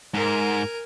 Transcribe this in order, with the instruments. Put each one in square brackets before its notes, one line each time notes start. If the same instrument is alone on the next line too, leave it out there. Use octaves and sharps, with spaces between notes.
[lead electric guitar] G#2 [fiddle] A#4 G#5